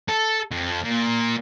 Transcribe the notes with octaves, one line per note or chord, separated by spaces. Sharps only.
A4
F2
A#2